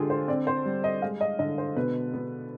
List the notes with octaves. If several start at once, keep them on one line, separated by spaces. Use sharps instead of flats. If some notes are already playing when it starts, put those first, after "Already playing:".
Already playing: D3 G#3 F4 G4 G#4
C5
C4 D5
C5
G3
D#5
G#3 F5
D#5
D3 D#5
C5
B2 B4
B3